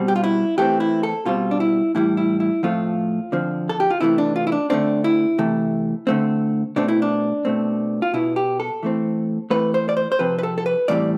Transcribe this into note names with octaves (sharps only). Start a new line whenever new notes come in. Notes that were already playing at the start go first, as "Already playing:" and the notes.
Already playing: B2 G3 C4
G4
F4
E4
E3 A3 C4 G4
E4
A4
B2 G3 C4 F4
D4
E4
A2 E3 G3 E4
E4
E4
A2 F3 A3 C4 F4
D3 F3 C4
A4
G4
F4
C3 E3 A3 E4
D4
F4
E4
D4
D3 A3 C4 D4
E4
C3 E3 A3
D3 A3 C4
B2 A3 C4 D4
E4
D4
B2 A3 C4
F4
B2 B3 E4
G4
A4
E3 A3 C4
E3 A3 C4 B4
C5
D5
C5
C5
C3 F3 C4 B4
B4
A4
A4
B4
A2 E3 G3 C4 D5